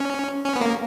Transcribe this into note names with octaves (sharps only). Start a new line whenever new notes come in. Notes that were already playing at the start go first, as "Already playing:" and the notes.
Already playing: C#4
C#4
B3
A#3